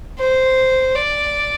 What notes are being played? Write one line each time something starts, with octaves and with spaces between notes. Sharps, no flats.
C5
D5